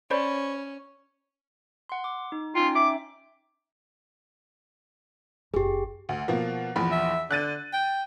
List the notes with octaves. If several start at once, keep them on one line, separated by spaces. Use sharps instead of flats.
C#4 C5 D5 B5
F#5 C6
D6
D#4
C#4 D#4 F4 G5
E5 D6
F#1 G4 G#4
D2
B2 F3 A#3
A#1 E2 B5
E5
D3 F#6 A6 D#7
G5